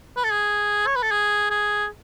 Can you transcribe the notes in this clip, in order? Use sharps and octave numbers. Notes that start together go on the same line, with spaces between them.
B4
A4
G#4
C#5
B4
A4
G#4
G#4